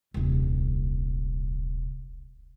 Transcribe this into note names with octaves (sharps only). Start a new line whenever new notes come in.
D#1 C2